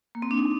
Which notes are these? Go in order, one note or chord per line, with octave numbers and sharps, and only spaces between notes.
A#3
C4
D4
D#4